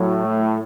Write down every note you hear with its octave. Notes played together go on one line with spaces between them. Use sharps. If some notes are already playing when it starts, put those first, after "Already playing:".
Already playing: A2 F#3
A3